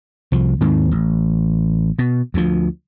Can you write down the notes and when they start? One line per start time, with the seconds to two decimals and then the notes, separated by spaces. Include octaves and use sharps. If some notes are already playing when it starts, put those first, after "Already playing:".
0.32 C2 F3
0.61 D#2 G#2 D#3 C4
0.91 A1
1.99 B2
2.34 D2 F3